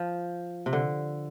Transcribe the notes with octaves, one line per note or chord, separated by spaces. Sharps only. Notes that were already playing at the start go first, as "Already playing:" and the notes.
Already playing: F3
C3
D3